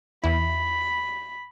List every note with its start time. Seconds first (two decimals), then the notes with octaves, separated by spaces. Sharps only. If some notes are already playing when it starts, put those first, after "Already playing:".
0.24 E2 E4 B5